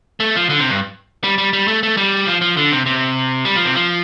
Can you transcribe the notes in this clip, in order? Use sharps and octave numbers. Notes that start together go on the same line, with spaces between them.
A3
F3
D3
C3
G2
G3
G3
G3
A3
A3
G3
F3
F3
D3
C3
C3
G3
F3
C3
F3